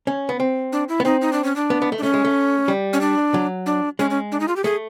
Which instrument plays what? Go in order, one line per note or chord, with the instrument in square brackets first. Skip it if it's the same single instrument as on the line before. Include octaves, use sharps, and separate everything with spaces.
[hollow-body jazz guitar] C#4
B3
C4
[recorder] D4
E4
[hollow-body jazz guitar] B3
[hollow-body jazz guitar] C4 [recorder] D#4
[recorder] D#4
D4
C#4
D4
[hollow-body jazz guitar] B3
B3
A3
[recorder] D4
[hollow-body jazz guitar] A3 [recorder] C#4
[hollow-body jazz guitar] G#3
A3
G3
[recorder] C#4
D4
[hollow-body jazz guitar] F#3
[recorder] D4
[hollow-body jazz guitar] G#3 [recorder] C#4
[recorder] C#4
D4
D#4
F4
G4
[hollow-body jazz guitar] A3 [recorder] G#4